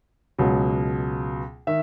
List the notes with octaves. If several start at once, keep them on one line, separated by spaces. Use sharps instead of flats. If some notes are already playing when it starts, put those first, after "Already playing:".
C#2 B2 F#3
D#3 E5